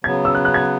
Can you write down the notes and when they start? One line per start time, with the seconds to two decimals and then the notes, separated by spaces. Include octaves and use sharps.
0.04 C#3 F#3 B3 G#6
0.25 E6
0.35 F#6
0.45 F#6
0.54 G#6